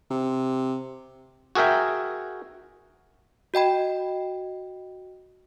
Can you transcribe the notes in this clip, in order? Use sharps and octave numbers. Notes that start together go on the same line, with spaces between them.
C3
F#4 G#4 A#4 E5 G5
F#4 D#5 G5 B5